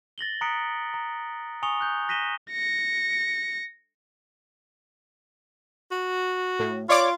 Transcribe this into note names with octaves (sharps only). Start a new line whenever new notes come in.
A6 A#6 F#7 G7
A#5 D#6 F#6 B6 C#7 D7
A#5
G#5 C#6 D#6 C#7 F7 G7
F#6 G6
F#6 A#6 B6 D#7 E7 G7
A#6 C#7
F#4
A2
F4 C#5 D5 D6